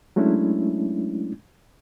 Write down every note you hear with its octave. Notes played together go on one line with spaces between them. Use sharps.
F#3 G#3 A3 C#4 D4 E4